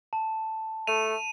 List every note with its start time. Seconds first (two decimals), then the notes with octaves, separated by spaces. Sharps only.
0.13 A5
0.87 A3 D#7 F7